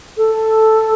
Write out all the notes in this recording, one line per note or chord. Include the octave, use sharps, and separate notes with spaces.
A4